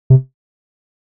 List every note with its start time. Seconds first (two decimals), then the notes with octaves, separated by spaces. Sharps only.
0.10 C3